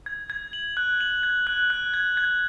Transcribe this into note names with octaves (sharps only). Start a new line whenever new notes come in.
G#6
G#6
F#7
F#6
F#7
G#6
F#6
F#6
G#6
G#6